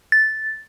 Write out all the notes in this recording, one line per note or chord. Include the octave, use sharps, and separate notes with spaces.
A6